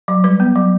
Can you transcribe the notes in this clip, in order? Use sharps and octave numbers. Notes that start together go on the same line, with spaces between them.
F#3
G3 B4
B3
F#3